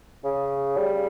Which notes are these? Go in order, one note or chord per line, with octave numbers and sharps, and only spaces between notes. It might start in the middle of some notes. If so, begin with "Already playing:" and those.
C#3
G3